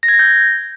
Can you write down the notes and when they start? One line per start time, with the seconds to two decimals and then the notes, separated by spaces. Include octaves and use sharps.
0.03 A#6
0.08 G#6
0.14 A#6
0.19 G6